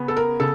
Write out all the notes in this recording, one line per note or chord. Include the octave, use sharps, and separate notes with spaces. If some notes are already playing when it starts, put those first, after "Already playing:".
Already playing: C#3 B3
A4
A#4
C#3 A4